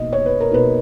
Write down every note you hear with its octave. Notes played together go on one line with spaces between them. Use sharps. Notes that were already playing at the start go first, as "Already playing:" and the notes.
Already playing: B2 A#3 D#4 D#5
C#5
B4
A#4
B2 A#3 D#4 B4